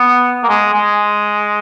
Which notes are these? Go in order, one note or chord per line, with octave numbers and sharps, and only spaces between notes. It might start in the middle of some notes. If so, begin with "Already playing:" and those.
Already playing: B3
A#3
G#3
G#3